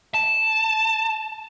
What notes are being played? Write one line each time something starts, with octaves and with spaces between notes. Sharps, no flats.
A5